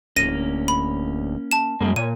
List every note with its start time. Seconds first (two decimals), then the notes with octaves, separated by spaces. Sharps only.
0.16 D1 A#3 C#4 A#6 D#7
0.68 B5
1.51 A5 E7
1.80 F#2 G3 G#3 A#3
1.96 A#2 C#5 D#7